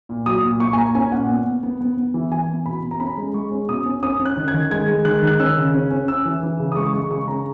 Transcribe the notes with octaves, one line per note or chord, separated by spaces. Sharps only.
A#2
F#3 D#6
A#2
A#2 C#6
G#5
A#2 A#5
C#4 G#5
A#2 F#5
B3
B3
B3
B3
B3
E3
E3 G#5
B3
B2 B5
B2
A#5
C#4 B5
G#3
G#3 C#6
C#4
B2 D#6
C#4
C#4 D#6
C#4
F#6
D#3
G#6
D#3
G#3 G#6
G#3
D#3 F#6
D#3 F#6
C#4 E6
C#3
C#4
C#4
C#4 E6
E3
E3
C#3
D#6
G#3 C#6
G#3 C#6
C#3 C#6
C#4 A#5